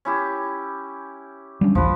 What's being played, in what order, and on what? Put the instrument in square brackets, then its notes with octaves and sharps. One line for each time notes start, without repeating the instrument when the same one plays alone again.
[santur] C#4 E4 G4
[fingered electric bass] G3 C#4 D4
[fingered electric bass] D#1 A#1 E2 [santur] F3 B4